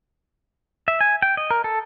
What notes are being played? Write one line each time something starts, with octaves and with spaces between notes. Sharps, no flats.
E5
G#5
G5
D#5
A#4
A4